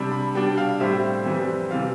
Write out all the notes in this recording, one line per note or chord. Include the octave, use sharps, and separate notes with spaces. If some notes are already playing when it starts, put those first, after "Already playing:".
Already playing: C3 G3 D4 B5
B5
B2 G3 D4 G5
F5
A2 G3 C4 E5
F2 E3 G3 C4
C3 E3 G3 F5